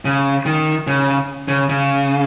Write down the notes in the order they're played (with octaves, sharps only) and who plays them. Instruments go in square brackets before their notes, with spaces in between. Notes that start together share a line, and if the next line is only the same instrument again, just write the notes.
[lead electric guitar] C#3
D#3
C#3
C#3
C#3